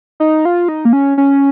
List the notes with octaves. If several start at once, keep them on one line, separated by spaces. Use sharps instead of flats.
D#4
F4
D#4
A#3
C#4
C#4